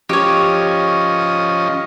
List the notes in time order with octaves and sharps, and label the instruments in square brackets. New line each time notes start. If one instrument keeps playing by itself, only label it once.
[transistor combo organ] F3 C#4 D#5 [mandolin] G4 C#5